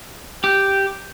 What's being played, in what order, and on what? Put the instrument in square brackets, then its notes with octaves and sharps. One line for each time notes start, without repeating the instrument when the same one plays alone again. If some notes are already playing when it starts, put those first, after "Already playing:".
[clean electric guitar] G4 [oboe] G5